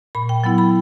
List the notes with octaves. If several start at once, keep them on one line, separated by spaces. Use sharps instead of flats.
A#2 B5
G5
F#3 B3 E4 G5
B5